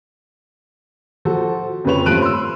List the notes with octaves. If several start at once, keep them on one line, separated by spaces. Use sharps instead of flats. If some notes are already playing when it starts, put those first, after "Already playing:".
F3 F#4 A4
F2 C#3 F4 B4 C#5 F7
G2 F3 A3 F#6 D7 D#7
C6 E6